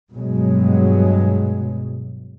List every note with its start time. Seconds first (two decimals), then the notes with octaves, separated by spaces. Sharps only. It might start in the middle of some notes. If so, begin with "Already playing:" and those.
0.13 G2 B2 F#3 G#3